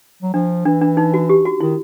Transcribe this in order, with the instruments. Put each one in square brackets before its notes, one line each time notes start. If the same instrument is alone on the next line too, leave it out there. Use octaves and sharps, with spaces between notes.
[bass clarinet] F#3
[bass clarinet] F3 [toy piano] D4
[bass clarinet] E3 [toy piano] D4
[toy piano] D4
D#4
F#4
G4
F#4
[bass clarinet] D#3 [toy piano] E4